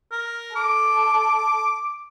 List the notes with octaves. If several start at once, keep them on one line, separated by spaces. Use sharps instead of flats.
A#4
A4 D6